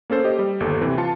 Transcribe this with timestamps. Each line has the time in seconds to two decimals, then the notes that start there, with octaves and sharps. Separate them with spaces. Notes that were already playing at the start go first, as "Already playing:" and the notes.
0.10 A#3 C#4 A4 C5
0.24 G4 D#5
0.39 G3
0.60 G1 D#2 G4 A4
0.81 C3 E3
0.98 F4 A5 C#7